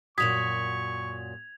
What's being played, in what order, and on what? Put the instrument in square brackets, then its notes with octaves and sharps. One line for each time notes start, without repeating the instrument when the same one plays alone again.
[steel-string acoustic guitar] F#2 A#2 F#4 [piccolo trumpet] C#6 [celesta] D#6 B6 [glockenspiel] G#6 F7